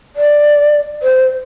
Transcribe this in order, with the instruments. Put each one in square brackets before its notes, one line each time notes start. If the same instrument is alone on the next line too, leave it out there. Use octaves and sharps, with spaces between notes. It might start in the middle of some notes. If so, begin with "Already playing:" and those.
[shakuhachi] D5
C5